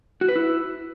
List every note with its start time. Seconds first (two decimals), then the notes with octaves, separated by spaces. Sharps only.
0.21 F#4
0.28 B4
0.36 E4